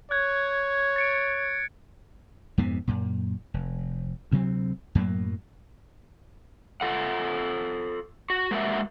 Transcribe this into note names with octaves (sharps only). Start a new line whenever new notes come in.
C#5 F#6 G#6
A6 C#7 D7
F2 G#2 C3 B3
F#2 A#2
F1
D2 C3 F#3 C4
F#2 A2 F#3 A#3
F4 A4 F#5
F#4
G#3 A#3 F#4 A#4 E5